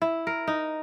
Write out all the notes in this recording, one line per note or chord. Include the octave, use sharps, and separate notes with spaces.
E4
A#4
D#4